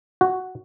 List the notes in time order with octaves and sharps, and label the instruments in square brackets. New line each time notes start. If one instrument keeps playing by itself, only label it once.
[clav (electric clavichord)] F#4